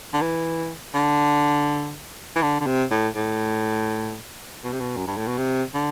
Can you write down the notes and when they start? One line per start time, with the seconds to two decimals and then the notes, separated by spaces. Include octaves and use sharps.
0.13 D3
0.21 E3
0.94 D3
2.36 E3
2.42 D3
2.60 D3
2.66 C3
2.91 A2
3.15 A2
4.64 B2
4.72 C3
4.80 B2
4.97 F#2
5.07 G2
5.17 A2
5.27 B2
5.37 C3
5.74 D3